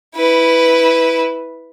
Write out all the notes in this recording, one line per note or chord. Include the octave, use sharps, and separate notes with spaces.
E4 B4